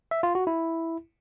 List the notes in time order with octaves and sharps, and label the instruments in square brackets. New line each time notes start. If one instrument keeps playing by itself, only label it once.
[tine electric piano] E5
F4
F#4
E4